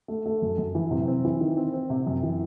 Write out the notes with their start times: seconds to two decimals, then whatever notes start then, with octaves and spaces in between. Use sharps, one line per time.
0.08 A3
0.26 A3
0.42 F#2
0.58 F#2
0.75 E3
0.91 C3
1.07 C4
1.25 E3
1.40 D#3
1.57 C4
1.73 C4
1.90 C3
2.07 F#2
2.23 E3